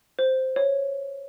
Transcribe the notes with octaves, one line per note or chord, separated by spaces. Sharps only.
C5
C#5